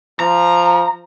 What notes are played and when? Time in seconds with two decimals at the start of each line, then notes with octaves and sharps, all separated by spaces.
0.20 F3 A#5